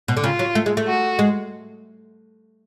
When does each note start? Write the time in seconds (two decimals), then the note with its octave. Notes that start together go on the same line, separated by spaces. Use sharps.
0.08 B2
0.17 D3
0.24 C#3 F4
0.39 F#3
0.55 A3
0.66 G#3
0.77 A3
0.87 F#4
1.19 G#3